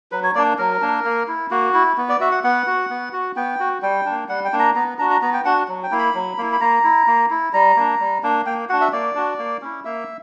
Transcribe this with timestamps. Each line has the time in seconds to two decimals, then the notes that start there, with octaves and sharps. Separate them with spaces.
0.12 F#3 B4
0.23 C#5
0.35 A#3 D4 D5
0.58 F#3 A#4
0.81 A#3 D4
1.05 A#3
1.28 E4
1.51 A#3 F#4
1.74 E4
1.97 B3
2.09 D5
2.21 F#4 E5
2.32 F#5
2.44 B3 F#5
2.67 F#4
2.90 B3
3.13 F#4
3.36 B3 G5
3.60 F#4
3.82 G3 G5
4.06 A#3 D4
4.29 G3 F#5
4.45 G5
4.53 A#3 D4
4.59 A#5
4.75 B3 A#5
4.99 D4 F#4 A#5
5.10 A#5
5.22 B3 A#5
5.33 G5
5.45 D4 F#4 F#5
5.68 F#3
5.83 G5
5.91 A#3 E4
5.99 B5
6.14 F#3
6.38 A#3 E4
6.52 B5
6.61 A#3 A#5
6.84 E4
7.07 A#3
7.30 E4
7.53 G3 A#5
7.77 A#3 D4
8.00 G3
8.23 A#3 D4
8.46 A#3 G5
8.69 F#4 F#5
8.73 D4
8.81 E5
8.92 A#3 D5
9.15 D4 F#4
9.39 A#3
9.62 C#4 E4
9.85 A#3 E5